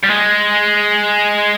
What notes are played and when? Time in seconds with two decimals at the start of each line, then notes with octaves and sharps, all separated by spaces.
0.03 G3
0.09 G#3